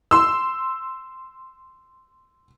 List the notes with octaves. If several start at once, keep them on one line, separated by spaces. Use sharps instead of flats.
C6 E6